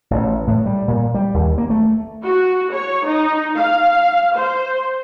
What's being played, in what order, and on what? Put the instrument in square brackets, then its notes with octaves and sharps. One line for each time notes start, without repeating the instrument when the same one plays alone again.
[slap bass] A1
A2
G3
A#2
G3
D#2
A#3
A3
[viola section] F#4
C#5
D#4
F5
C5